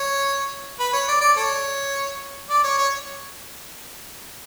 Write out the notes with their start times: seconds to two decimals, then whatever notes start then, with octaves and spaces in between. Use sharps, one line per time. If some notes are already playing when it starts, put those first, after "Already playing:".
Already playing: C#5
0.79 B4
0.93 C#5
1.08 D5
1.21 D5
1.36 A4 C#5
2.50 D5
2.63 C#5
2.78 C#5